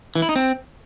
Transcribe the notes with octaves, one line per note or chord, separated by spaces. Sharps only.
E3
E4
D#4
C4